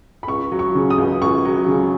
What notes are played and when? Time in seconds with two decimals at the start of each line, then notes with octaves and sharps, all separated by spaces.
0.23 B5
0.27 C#2 C#6
0.52 F#3
0.59 C#6
0.75 C#3
0.90 D#6
0.98 C#2
1.22 C#2 C#6
1.45 F#3
1.68 C#3